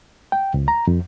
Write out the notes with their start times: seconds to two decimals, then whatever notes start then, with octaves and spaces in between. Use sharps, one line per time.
0.32 G5
0.54 C#2
0.68 A#5
0.87 F2